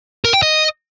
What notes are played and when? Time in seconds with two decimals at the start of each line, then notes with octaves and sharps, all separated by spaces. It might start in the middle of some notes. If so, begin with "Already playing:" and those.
0.24 A#4
0.34 G5
0.43 D#5